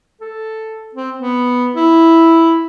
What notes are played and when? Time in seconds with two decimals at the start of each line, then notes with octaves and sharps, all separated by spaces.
0.21 A4
0.95 C4
1.19 B3
1.75 E4